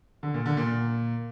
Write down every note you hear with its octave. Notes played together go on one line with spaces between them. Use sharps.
D3
A#2
D3
A#2